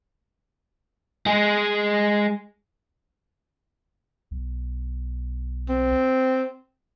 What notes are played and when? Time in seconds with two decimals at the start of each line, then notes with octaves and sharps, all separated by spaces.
1.26 G#3 G#4
4.31 B1
5.69 C4